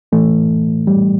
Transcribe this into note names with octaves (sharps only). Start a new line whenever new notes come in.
A2 E3 A3
G3